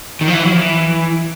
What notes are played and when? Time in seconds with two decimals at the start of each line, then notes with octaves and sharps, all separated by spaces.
0.21 D#3
0.28 F3
0.33 E3
0.45 F#3
0.52 F3
0.57 E3